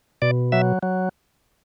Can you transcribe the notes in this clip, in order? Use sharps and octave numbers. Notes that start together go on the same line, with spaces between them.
B2 D5
F#3 E5
F#3